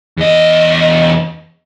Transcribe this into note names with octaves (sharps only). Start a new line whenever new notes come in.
E2 D#5